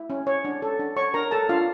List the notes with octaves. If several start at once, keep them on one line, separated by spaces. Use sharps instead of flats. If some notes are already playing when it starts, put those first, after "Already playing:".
Already playing: E4
C#4
C#5
D4
A4
D4
C#5 C#6
D4 A#4 A#5
A4 A5
D4 F4 F5